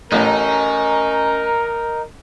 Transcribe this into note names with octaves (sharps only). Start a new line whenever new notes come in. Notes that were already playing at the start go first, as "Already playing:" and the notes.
A1 A2 C#4 D#4 A#4